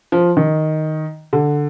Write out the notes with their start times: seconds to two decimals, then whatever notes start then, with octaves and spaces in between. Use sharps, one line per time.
0.12 F3
0.37 D#3
1.33 D3